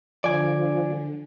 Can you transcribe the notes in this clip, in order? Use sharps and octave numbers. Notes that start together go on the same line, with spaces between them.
D3 F3 D5 G#5